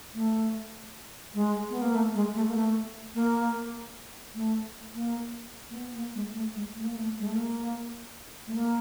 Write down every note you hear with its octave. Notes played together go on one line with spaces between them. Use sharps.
A3
G#3
B3
A#3
A3
G#3
A3
A#3
A3
A#3
A3
A#3
A#3
B3
A#3
G#3
A3
G#3
A3
A#3
A3
G#3
A3
A#3
A3
A#3